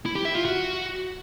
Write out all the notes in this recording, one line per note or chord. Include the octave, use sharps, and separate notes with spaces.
E4
G4
E5
F4
F#4